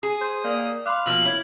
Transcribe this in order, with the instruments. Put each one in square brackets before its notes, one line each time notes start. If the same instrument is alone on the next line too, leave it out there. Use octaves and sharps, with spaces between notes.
[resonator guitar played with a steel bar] G#4 [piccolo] D#6
[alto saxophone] C5 [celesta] C6
[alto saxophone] A#3 [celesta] D5
[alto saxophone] F5 [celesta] B5 C6 D6 [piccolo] F#6
[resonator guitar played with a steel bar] B2 F3 A#3 [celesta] E6 [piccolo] F#7
[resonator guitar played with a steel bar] E4 [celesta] C#5 G#6